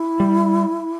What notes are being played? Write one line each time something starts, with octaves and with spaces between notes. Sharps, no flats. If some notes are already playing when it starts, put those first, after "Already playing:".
Already playing: E4
G3